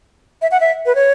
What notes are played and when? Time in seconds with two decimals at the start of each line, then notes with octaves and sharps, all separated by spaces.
0.42 E5
0.51 F#5
0.60 E5
0.86 B4
0.95 C#5